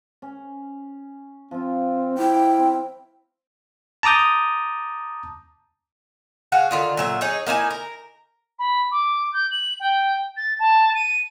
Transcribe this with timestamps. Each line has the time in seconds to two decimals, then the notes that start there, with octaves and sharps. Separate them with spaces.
0.22 C#4
1.51 F3 C4 F4
2.18 E4 G5 B5
2.59 C4
4.03 A5 A#5 D6 D#6 G6
6.52 F#4 G#4 F5
6.71 D3 D#3 F4
6.97 A#2 F#3 E5
7.21 D#4 G#4 C#5
7.47 A#3 D#4 E4 G#5
7.70 A#4
8.59 B5
8.91 D6
9.33 G6
9.51 F#7
9.80 G5
10.36 A6
10.59 A5
10.95 D#7